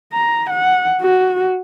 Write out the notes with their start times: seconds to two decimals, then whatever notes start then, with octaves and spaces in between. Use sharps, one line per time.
0.13 A#5
0.50 F#5
1.01 F#4